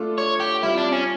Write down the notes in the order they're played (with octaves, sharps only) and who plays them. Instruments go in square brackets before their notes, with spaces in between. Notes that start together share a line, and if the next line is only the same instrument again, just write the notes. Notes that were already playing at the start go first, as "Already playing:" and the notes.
Already playing: [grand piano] A3 D4 F4 A4
[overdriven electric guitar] C#5
G4
[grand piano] G3 C4 F4 [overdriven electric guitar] E4
[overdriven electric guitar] D4
C#4